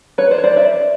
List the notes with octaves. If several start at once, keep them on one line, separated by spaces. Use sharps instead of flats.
B4 C#5
C5 D5
C#5
C5 D5
D5 E5